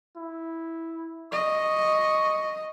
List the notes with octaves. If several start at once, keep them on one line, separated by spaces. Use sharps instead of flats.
E4
D#5 C#6